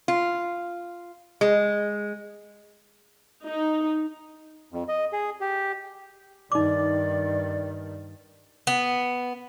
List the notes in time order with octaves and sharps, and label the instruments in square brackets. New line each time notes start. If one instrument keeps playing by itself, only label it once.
[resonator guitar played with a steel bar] F4
G#3
[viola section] D#4
[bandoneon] F2
D#5
G#4
G4
[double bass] G2 D#3 [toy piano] D#4 D6 [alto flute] D5
[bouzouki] B3